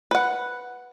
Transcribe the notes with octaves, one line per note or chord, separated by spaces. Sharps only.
B4 F#5